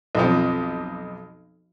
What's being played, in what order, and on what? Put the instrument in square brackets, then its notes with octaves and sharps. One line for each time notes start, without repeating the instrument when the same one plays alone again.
[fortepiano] B1 F2 F3